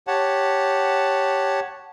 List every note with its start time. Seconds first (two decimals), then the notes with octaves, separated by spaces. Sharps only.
0.07 G4 C#5 F#5 A5